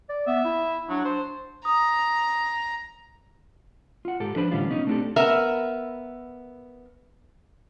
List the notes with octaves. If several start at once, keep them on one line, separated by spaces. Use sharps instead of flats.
D5
B3 E5
E4
F#3 D4
C5
A#5 D#6
F4 F#5
G#2 G4 A4
F3 D4 B4 C5 B5
A2 D3 E3 G3 C#4 F4
B2 C#4 D#4
A3 C4 D4 F4 G4 A4
B3 A#4 E5